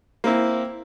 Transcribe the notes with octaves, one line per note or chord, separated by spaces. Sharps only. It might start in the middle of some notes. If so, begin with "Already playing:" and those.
A#3 C4 E4